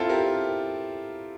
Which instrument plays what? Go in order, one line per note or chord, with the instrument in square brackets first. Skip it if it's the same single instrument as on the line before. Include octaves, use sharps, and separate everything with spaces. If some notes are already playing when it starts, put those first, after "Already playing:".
Already playing: [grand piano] C4 E4 F4 A4
G4 A#4